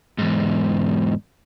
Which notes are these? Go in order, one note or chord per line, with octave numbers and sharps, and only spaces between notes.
E2 G#2